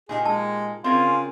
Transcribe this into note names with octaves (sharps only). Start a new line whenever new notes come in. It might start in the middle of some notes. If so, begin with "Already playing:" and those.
A#2 D#4 G4 G#4
G#3 A5
C#3 C4 F4 A#4 G#5